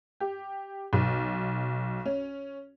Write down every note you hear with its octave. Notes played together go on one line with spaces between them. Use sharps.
G4
B1
C#4